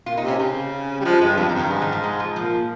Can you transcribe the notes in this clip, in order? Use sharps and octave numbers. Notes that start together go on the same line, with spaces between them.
A#2 F4
D#4
C3
C#4
C#3 C4
G3
F3 G#3
G2 G#3
F2 F3
F2 D#3
G2
D#3
G#2 F3
D#3
F3
G#3
F3
A#2 F3